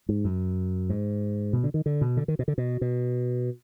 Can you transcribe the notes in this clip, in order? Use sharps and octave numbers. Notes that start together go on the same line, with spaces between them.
G#2
F#2
G#2
B2
D3
D#3
D3
B2
D3
D#3
B2
D3
B2
B2